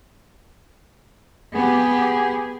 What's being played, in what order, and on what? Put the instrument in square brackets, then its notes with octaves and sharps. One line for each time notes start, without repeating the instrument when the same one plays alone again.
[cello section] B3 G4 [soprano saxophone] G#4